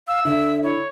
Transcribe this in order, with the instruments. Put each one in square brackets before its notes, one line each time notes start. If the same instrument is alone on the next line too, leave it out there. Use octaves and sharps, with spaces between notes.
[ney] F5 [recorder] E6
[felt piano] D3 [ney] E5
[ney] E4 [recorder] C#5